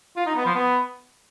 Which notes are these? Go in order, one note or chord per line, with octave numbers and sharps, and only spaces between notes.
F4
D#4
B3
F3
B3